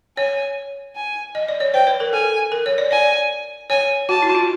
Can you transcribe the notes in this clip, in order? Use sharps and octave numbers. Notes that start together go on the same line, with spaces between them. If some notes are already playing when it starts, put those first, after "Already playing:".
C#5 G#5
G#5
D#5
D5
C#5
C5 G5
B4
A#4
A4 G#5
A#4
C#5
D5
D5 G#5
C#5 G#5
F#4 A5
E4
F#4
F4